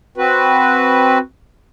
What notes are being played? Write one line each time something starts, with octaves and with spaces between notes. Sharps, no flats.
C4 F#4 B4